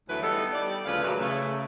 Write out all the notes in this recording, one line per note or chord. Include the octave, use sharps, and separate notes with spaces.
D2 E3 F#3 A3 E4 B4
G3 B3 D#4 A4
G3 D5
D2 C#3 F3 B4 F5
E2 A#2 E3 F#3 B4
C#3 A3